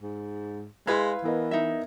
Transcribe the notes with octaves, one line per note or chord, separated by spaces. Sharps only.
G#2
G#3 E4 B4 F5 C6 G#6
E3 B3 A#4 D#5
D#4 E5